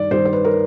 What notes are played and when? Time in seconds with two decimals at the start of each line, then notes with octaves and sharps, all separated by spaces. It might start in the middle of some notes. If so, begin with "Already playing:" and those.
Already playing: G2 D#3 D5
0.11 G2 D#3 C5
0.25 C5
0.33 B4
0.45 A#4